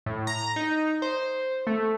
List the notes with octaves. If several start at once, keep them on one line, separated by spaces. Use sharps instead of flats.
A2
A#5
D#4
C5
A3